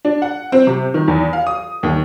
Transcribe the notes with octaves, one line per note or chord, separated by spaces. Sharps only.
D4
F#5
C4
C3
D#3
E2
F5
D#6
D#2